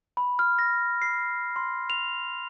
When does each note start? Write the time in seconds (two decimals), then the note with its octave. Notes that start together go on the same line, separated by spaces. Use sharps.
0.17 B5
0.39 F6
0.59 A#6
1.02 C7
1.56 C6
1.90 F7